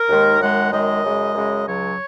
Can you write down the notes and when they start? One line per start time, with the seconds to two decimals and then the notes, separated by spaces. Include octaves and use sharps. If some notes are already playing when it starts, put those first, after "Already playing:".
Already playing: A#4
0.08 D#2 D#3 G#3
0.40 F#2 D#3 G#3 F#5
0.71 F#2 D#3 G#3 D#5
1.03 F#2 C#3 G#3
1.35 F#2 C#3 G#3
1.66 C#2 C#3 F#3 C#5